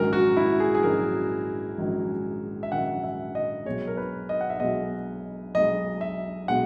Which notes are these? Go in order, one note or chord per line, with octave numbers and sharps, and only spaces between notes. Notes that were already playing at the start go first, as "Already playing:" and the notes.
Already playing: A#1 G#2 D#3 F#3 C#4 A#4
F#4
E4
G#4
G#4
A#1 G#2 D#3 F#3 C#4 A#4
A#1 G#2 D#3 F#3 C#4
E5
A#1 G#2 D#3 F#3 C#4 F#5
E5
D#5
B1 B2 G#3 C#5
A#4
B4
D#5
F#5
E5
B1 B2 G#3 D#5
B1 B2 G#3 D#5
E5
B2 G#3 F#5